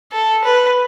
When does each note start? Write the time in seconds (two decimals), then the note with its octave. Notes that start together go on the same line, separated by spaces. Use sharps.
0.12 A4
0.44 B4